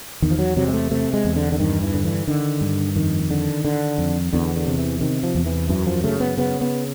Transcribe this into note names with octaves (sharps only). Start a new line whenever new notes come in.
E2 D#3
F3
F#3
C3 F#3
G#3
A3
C3 A3
G#3
E2
D3
D3
G2 D#3
E3
D3
E3
D3 D#3
G2
F2 D#3
D3
D3
F2
E2 D3
D3
C3
E3
C3 D#3
F3
E2
E3
F#2 E3
F3
C#3 A3
B3
C#3 B3
B3